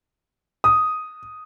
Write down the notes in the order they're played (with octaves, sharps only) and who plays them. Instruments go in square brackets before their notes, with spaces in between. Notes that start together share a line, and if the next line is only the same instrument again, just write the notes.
[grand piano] D#6